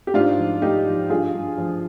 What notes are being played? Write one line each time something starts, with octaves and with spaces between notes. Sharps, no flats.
G4
G#2 D4 F4
F3
G#2 D#4 G4
F3
G2 F4 G#4
G2
F3